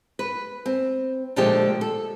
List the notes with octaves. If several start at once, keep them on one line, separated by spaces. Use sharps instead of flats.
B4
C4
A#2 D3 F3 G#3 A3 G4
A4